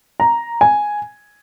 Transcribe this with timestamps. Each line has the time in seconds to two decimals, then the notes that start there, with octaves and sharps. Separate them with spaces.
0.20 A#5
0.61 G#5